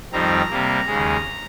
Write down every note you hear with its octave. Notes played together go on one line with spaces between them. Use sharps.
F2 D#3 G3 C4 A#5
C3 G3 A#3
D#2 C#3 G#3